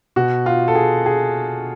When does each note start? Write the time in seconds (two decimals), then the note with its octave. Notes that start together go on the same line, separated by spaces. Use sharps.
0.16 B2 F#4
0.46 F4
0.68 A4
0.75 G#4
1.06 G#4